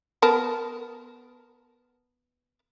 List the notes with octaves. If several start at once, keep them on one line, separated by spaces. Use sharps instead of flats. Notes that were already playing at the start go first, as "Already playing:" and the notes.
B3 A#4 A5